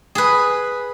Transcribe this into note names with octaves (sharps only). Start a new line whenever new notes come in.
G#4 B4